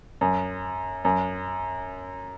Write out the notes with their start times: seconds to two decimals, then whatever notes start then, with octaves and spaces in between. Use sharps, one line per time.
0.21 F#2
1.05 F#2